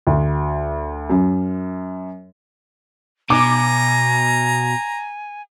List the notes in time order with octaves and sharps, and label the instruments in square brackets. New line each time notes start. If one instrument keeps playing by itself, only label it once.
[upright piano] D2
F#2
[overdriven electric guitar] B2 [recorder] G#5 [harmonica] A#5 [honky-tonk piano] D6